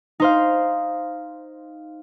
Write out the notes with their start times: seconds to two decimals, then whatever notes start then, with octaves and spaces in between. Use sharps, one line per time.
0.20 D#4 C5 F5